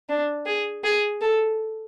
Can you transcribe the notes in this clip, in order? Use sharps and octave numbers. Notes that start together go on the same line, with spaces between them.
D4
G#4
G#4
A4